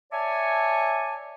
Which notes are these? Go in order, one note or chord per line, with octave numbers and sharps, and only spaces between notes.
C#5 D5 E5 G#5 A5